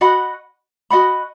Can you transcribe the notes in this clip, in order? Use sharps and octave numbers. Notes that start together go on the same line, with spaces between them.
F#4 D#5 F#5 B5
F#4 D#5 F#5 B5